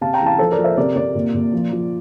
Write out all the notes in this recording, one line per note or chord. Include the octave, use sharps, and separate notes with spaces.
C3 F5 A5
G5 A#5
E3
F5 A5
F3 A4 C5
A#4 D5
F3
C5 E5
C3 A#4 D5
C3 A#4 D5
A#2
A#2
F3
F3